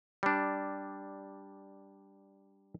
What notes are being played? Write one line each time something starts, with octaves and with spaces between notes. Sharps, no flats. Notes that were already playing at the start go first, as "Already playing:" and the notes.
G3 D4